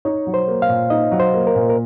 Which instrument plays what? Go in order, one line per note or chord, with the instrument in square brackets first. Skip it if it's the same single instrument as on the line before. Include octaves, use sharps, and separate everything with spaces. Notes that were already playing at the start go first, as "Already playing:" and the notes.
[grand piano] D#4 [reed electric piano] C#5
[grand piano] F#3
[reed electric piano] C5
[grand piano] A#3
[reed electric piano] F5
[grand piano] A#2
[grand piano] D#4 [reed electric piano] D#5
[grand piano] F#3
[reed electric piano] C5
[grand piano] A#3
[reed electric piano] A#4
[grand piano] A#2
[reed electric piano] A#4